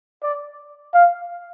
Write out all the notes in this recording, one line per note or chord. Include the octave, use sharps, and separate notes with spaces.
D5
F5